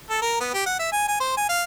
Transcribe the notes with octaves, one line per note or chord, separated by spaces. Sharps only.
A4
A#4
B3
G4
F#5
E5
G#5
G#5
C5
G#5
F5